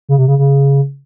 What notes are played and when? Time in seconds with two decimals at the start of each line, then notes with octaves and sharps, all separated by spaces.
0.09 C#3
0.18 C3
0.28 C#3
0.39 C#3